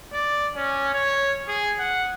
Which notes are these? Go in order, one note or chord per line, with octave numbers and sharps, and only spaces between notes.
D5
C#4
C#5
G#4
F#5